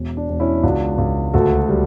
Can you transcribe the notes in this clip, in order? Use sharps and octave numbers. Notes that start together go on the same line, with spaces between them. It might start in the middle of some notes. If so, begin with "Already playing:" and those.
Already playing: E1
D4
E1
C#4 E4
C#2 D4 F#4
C#2
D2 F#4 A4
G3